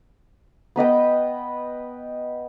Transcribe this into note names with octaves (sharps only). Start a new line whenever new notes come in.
B3 B4 D#5 G5